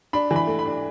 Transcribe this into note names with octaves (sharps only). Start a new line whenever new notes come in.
D4 B5
E3
B5
A3
B5
D4